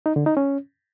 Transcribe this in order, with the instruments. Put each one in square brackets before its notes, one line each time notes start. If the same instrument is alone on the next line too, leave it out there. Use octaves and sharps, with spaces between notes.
[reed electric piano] D#4
D3
D#4
C#4